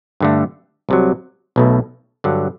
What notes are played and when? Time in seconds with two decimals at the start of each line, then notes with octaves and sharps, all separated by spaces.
0.21 G2 D3 A3
0.89 C2 C3 F#3
1.56 B1 B2 A3
2.24 G2 D3 F#3